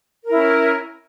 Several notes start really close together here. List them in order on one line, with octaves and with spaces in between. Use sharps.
A#4 E4 C#4